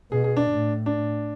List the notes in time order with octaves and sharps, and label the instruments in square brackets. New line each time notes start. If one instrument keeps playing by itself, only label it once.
[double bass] B2 [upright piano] G#4
[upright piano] G#4
D4
[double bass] A2
[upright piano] D4